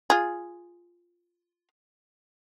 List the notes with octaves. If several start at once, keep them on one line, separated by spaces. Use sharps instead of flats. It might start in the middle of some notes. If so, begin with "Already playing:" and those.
F4 G#4